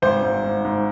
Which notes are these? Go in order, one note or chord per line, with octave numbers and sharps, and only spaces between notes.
G#1 C5
G#2
G#2
G#2